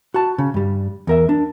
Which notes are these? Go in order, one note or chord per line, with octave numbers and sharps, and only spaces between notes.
F#4 A5
C#3
G2 G3
E2 A#4 E5
D4